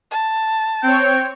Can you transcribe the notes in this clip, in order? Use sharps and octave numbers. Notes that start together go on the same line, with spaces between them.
A5
C4 C#5 G5